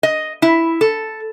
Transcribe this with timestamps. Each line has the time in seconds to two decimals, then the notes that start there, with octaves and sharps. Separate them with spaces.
0.03 D#5
0.42 E4
0.81 A4